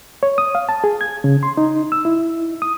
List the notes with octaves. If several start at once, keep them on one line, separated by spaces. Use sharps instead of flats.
C#5
D#6
F5
A5
G#4
G#6
C#3
C6
D#4
E6
E4
D#6